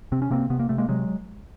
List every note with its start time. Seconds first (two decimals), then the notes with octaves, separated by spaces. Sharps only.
0.12 C3 C4
0.22 C#4
0.30 C3 A#3 C4
0.50 C3 B3
0.59 A#3
0.69 C3 A3
0.78 G#3 A#3
0.88 C3 F#3 G#3